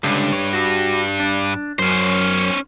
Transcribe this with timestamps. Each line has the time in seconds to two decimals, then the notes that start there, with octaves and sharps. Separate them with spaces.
0.04 C#2 G2 D3
0.33 C#5
0.53 F#4
1.20 D4
1.79 F#2 C#4 C5